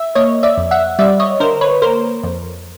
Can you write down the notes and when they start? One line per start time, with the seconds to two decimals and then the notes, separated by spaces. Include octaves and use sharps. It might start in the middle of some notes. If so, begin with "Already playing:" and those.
Already playing: E5
0.15 A#3 C#5 D#5
0.43 D5 E5
0.58 F2
0.71 E5 F#5
0.99 G3 D5 E5
1.20 C#5 D#5
1.40 D3 A#4 C5
1.61 B4 C#5
1.82 A#3 A#4 C5
2.23 F2